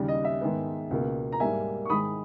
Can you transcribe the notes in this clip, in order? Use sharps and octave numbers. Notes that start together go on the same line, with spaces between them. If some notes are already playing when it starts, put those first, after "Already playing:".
Already playing: D#2 C#3 G3
D#5
E5
G#2 D#3 G#3 B3
C#2 B2 A#3
A#5
G#2 G3 A#3 E5 G#5
C#6
G#2 D#3 G#3 B5 D#6